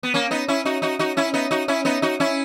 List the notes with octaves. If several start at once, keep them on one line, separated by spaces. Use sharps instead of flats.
B3
A#3 C#4
B3 D#4
C#4 E4
D#4 F#4
D#4 F#4
D#4 F#4
C#4 E4
B3 D#4
D#4 F#4
C#4 E4
B3 D#4
D#4 F#4
C#4 E4